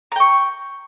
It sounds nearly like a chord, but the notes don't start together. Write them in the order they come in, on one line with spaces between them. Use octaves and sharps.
A#5 G5 C#6